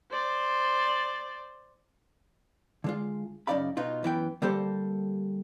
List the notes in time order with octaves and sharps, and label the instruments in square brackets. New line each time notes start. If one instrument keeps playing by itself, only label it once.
[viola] C5 D5
[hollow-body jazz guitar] D3 G#3 F4
F#2 C#3 D#4 D5 F5 B5
B2 B3 D#4 F4
F#2 E3 B3 G5
D3 G3 A#3 G4 A4 C5